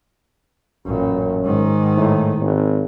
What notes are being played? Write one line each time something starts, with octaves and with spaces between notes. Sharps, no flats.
A1 F#2 A#2
G#2 D#3
A2
G#1